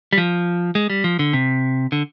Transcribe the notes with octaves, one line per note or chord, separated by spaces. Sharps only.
G3
F3
G#3
G3
F3
D3
C3
D3